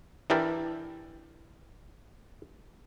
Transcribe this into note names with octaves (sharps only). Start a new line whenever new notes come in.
E3 D4 E4 G4 A#4 D5